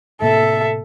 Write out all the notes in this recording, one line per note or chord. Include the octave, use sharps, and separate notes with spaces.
A2 C3 A#3 A4 E5